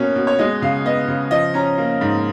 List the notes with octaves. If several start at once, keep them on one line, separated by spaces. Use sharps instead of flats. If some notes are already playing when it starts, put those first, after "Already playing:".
Already playing: B2 A#3 C#4
B2
C#5
G#3 D#5
C#3 F5
B3 D#5
C#3
F3 D#5
C#4 A#5
A#3
G#2